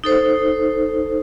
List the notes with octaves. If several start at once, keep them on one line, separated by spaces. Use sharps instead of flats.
D#4 A4 C5